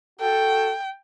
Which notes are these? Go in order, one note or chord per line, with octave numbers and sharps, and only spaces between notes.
F#4 A4 G5